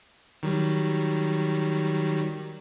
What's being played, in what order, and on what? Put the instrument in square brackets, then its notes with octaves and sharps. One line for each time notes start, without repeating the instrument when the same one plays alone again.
[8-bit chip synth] D#3 F#3 G3